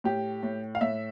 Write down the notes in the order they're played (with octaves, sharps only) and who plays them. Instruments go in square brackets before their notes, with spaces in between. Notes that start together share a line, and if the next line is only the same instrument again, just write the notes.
[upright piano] A2 G4
A2
F5
A2 E5